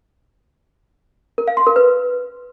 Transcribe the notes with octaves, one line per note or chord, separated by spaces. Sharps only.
A#4
F5
C6
A#4
B4